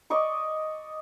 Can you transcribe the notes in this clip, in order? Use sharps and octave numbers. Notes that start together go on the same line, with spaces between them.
D5 D#5 C#6 D6